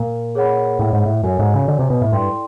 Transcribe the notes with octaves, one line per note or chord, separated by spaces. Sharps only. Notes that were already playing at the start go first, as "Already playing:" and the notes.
Already playing: A#2
G#4 C#5 F#5 B5
A2
G#2
A2
F#2 F#4 A4 C#5 E5 G#5
G#2
C#3
D3
C3
B2
A2
G2 E4 A4 D5 G5 C6